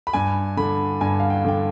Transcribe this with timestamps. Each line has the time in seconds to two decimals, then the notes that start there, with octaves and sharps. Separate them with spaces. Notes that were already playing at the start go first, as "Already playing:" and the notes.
0.07 B5
0.13 G2 G#5
0.57 D3 B5
1.01 G2 G#5
1.20 F5
1.30 G5
1.45 D3 G5